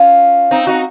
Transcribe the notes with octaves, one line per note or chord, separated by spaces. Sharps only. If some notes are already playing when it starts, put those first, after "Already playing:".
Already playing: C#4 F4
C4 D#4
D#4 F#4